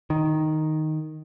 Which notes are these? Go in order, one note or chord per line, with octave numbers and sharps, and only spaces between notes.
D#3